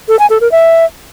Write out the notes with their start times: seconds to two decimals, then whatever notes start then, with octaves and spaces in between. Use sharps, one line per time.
0.08 A4
0.19 G#5
0.30 A4
0.41 A#4
0.52 E5